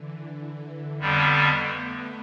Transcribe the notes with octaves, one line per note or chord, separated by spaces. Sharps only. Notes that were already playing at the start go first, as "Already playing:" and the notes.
Already playing: D3 E3
E3
E3
F2 D3 G3 B3
A3